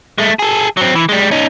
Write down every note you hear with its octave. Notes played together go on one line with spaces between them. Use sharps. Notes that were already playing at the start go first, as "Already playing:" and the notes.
G#3 A3
G#4 A4
F#3 C4
E3
G3 G#3
C#4 D#4